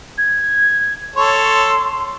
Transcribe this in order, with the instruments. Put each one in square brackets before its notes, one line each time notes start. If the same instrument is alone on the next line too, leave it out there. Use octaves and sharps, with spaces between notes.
[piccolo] G#6
[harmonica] A4 C#5 [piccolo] C6